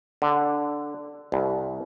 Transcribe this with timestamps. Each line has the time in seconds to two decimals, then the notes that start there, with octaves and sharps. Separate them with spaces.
0.22 D3
1.32 C2